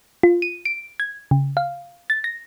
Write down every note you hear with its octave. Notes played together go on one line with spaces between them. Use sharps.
F4
D#7
D7
G#6
C#3
F5
A6
A#6